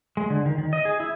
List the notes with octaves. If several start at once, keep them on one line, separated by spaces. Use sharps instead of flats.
G#3
D3
D#3
D#3
D#5
G#4
E4